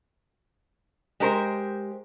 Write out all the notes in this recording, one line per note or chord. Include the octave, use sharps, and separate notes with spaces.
G#3 G4 A#4 C5